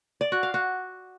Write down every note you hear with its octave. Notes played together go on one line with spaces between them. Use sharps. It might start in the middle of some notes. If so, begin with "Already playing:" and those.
D5
F#4
F5
F#4